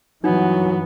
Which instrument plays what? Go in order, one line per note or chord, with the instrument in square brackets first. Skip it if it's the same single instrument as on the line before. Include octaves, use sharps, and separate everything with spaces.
[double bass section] G2 E3 [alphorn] F#3 [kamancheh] B3 [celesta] D#4